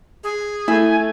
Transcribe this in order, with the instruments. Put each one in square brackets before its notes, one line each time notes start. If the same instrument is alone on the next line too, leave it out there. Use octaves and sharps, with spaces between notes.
[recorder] G#4
[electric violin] A3 [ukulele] E4 [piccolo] G#5